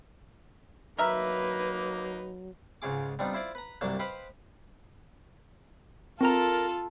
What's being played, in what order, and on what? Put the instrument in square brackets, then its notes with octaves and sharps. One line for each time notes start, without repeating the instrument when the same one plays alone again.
[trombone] F#3 [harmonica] A#3 D#4 [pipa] A#4 E5 [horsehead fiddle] B4
[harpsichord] C#2 G#2 C#3 F4 G#4 D6
G3 B3 C4 D4 D#4 F4
E4 F4 C5 D5
B4 A#5
C2 G2 F#3 A#3 D4 A5
B4 C5 D#5 F5 G5 B5
[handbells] C4 A#5 [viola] F4 [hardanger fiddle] A4 [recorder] A#4